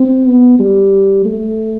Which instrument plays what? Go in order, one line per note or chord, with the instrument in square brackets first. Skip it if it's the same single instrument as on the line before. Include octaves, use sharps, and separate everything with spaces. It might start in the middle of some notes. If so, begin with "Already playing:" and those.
Already playing: [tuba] C4
B3
G3
A3